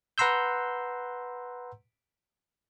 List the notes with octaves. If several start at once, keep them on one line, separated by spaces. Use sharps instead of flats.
B4 F#5 A#5 C6 E6 G6